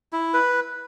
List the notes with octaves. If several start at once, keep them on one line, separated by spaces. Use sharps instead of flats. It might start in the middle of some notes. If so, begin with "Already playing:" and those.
E4
B4